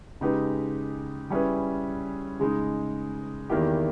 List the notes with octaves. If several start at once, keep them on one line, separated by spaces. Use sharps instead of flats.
C#3 G#3 D#4 G4 B4
G3 C#4 E4 G#4 B4
C#3 G#3 D#4
E2 D#3 A#3 E4 G4